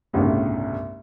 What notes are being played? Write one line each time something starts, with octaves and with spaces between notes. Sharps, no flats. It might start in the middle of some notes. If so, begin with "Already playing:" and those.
G1 C2 A2 C#3